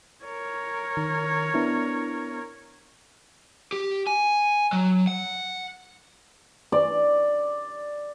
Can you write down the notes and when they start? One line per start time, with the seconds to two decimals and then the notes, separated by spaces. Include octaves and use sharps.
0.25 A#4 C#5
0.97 D#3
1.54 B3 D4 E4
3.72 G4
4.07 G#5
4.73 F#3
5.07 F#5
6.72 D5